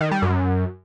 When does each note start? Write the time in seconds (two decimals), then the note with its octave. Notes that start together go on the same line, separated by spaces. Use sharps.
0.01 D#3
0.11 G3
0.22 F#2